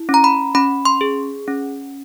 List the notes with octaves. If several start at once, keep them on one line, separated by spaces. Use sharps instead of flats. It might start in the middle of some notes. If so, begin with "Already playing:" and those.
Already playing: E4
C#4
A#5
B5
C#4 B5
C6
G#4
C#4